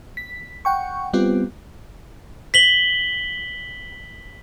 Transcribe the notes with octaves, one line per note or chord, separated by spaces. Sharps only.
B6
F#5 G5 C#6
G3 B3 C4 F4 G4
B6 F#7 G7